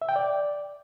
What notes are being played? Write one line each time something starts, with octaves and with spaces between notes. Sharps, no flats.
E5
G5
D5